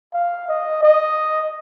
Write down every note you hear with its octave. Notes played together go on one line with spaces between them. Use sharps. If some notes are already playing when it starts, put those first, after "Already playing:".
F5
D#5
D#5